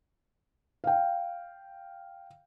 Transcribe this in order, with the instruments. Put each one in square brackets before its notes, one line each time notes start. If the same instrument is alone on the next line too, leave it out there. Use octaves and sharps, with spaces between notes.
[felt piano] F5 G5